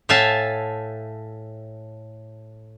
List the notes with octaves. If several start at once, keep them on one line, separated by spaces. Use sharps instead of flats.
A2 E5 F5 G#5 A5